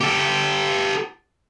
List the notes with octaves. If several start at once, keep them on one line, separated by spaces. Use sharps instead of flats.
G4 A4